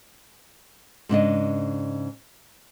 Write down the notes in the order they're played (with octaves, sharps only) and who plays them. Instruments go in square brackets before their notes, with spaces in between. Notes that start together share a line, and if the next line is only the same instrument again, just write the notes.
[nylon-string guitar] G#2 C#3 D4 D#5